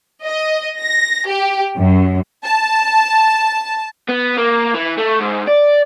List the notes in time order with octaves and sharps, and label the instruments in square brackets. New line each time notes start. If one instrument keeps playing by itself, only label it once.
[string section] D#5
A#6
G4
F#2
[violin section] A5
[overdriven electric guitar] B3
A#3
E3
A3
G#2
D5